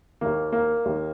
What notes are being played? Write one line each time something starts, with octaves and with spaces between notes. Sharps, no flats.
D#2 D#3 A#3
A#3
D#2 D#3